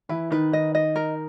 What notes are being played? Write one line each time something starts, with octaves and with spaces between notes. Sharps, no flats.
E3 E4 B4
D#3 D#4 B4
D#3 D#4 D#5
D#5
A#4